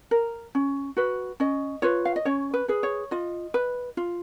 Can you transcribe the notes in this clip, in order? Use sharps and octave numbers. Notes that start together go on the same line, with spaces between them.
A#4
C#4
F#4 B4
C#4 D#5
F4 B4 C#5
F5
D#5
C#4 C#5
B4
G#4 B4
C#5
F4 D#5
B4
F4